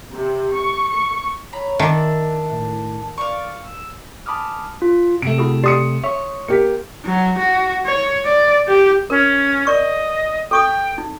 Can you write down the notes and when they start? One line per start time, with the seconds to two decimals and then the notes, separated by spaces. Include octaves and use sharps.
0.13 C3
0.55 C#6
0.90 C#6
1.53 C#5 A#5 B5
1.79 D#3 D4 E5
2.52 A2
3.18 D5 F5 C#6
3.62 E6
4.26 G#5 A5 B5 D6 D#6 F6
4.82 F4
5.22 C3 A3 D7
5.38 E4 F#4 G#4
5.64 G4 D5 C6 D#6 C7 C#7
6.04 C#5 E5 C#6
6.48 A#3 G4 B6 C#7
7.05 F#3
7.39 F#4
7.86 C#5
8.25 D5
8.68 G4
9.10 C#4 A#4
9.67 A#4 D5 D#5 C#6
10.51 A4 G5 C#6 D#6
10.98 D#4